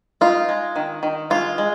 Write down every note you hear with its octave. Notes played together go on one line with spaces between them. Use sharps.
D#4 F4
G#3
D#3
D#3
G#3 F4
G#3